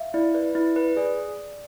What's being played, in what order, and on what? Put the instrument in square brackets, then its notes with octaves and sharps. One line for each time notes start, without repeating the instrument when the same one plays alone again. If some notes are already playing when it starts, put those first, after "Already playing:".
Already playing: [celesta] E5 F5
[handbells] E4 [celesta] D5
[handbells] B4 [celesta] D5
[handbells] E4
B4
[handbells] G#4 [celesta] D5